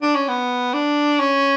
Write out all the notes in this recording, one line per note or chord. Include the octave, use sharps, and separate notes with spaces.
D4
C#4
B3
D4
C#4